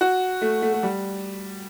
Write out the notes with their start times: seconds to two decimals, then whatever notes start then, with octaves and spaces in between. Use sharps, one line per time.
0.01 F#4
0.42 A3
0.62 A3
0.73 A3
0.83 G3